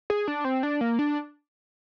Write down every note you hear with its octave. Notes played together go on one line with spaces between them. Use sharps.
G#4
D4
C4
D4
A#3
D4